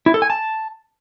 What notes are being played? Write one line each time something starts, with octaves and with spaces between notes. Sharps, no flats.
E4
A4
G#5
A5